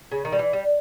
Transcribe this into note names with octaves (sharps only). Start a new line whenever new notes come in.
C#3
D#3
G3
E3
G3